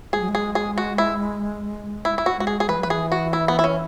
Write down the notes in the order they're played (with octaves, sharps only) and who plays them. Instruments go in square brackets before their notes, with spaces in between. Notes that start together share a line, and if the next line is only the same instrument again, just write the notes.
[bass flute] G#3 [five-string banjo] G#4
[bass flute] F#3
G#3
[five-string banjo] G#4
G#4
F#4
E4
E4
E4
F#4
[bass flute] G#3 [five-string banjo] F#4
[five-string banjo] G#4
G#4
[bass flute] E3 [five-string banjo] B4
[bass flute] F#3
[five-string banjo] B4
[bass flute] E3 [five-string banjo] G#4
[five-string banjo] F#4
E4
B3
E4
C#4